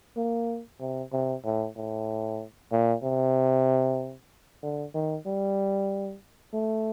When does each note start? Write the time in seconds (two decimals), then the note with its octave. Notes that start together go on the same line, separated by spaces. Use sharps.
0.17 A#3
0.80 C3
1.13 C3
1.45 A2
1.76 A2
2.72 A#2
3.03 C3
4.63 D3
4.95 D#3
5.26 G3
6.54 A3